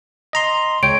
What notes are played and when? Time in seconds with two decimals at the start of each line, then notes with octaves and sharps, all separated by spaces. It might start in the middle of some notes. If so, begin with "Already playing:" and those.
0.33 D#5 A#5 C6
0.83 C#2 C#5 G5 D7